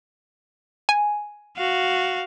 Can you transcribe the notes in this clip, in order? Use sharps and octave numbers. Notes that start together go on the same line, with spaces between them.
G#5
F#4 F5